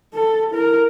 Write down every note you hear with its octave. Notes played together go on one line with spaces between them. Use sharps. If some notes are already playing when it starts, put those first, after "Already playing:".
A4
E4 A#4